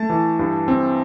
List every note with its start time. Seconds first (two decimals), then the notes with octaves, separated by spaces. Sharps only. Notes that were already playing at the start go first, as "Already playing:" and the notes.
Already playing: A3 A5
0.10 E3
0.39 G2
0.68 C4